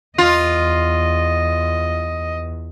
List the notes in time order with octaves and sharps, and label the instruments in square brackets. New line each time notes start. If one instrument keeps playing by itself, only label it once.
[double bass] E2 [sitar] F4 [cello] D#5